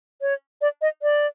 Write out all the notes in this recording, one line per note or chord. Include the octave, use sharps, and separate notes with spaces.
C#5
D5
D#5
D5